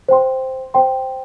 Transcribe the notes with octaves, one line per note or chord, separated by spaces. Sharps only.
C5 G5 C6
C5 G5 C6